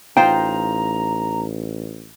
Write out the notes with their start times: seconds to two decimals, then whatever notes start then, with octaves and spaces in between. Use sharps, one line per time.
0.17 A1 D#4 F4 C5 G5 A#5